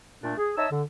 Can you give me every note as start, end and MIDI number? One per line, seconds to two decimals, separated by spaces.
0.23 0.33 46
0.23 0.33 57
0.23 0.33 62
0.37 0.52 68
0.56 0.66 63
0.56 0.66 73
0.56 0.66 75
0.56 0.66 76
0.56 0.66 81
0.56 0.66 88
0.70 0.82 50